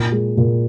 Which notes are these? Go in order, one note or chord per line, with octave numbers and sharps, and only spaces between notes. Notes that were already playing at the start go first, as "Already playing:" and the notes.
Already playing: A#2
G#3
A#2